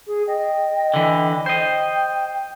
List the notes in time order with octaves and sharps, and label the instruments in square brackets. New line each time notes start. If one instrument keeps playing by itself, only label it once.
[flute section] G#4
D#5 G5
[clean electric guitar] D3 E3
[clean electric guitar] C5 D#5 [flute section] G5